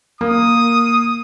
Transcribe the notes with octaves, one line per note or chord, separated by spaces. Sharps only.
A#3 D#6